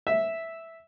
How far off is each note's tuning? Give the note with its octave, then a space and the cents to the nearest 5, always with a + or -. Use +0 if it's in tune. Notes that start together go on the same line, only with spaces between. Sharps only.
E5 -5